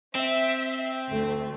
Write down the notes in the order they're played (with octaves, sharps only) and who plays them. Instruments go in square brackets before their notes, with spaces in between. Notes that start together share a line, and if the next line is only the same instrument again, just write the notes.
[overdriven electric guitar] C4 [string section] E5
[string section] D2 A3